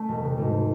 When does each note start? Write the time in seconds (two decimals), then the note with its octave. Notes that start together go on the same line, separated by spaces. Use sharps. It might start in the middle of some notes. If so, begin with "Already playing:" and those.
Already playing: A3
0.08 E1
0.23 C3
0.38 G#1